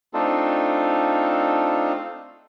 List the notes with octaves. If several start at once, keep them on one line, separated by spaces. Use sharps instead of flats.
A3 C4 D4 D#4 F4 A4